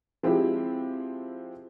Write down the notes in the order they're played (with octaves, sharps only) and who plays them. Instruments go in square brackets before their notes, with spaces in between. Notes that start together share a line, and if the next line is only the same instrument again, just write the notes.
[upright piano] F3 G#3 C4 E4 G4